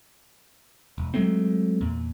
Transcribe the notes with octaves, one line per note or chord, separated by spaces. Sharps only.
E1
F#3 G#3 A3 C4
E2 A#2